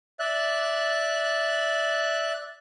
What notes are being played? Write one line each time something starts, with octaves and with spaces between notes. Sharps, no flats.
D5 E5 F#6